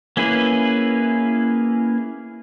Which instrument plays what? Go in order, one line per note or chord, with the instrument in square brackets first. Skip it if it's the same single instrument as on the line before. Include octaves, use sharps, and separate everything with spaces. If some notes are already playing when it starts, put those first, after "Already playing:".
[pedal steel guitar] A#3 C#4 E4 G#4 B4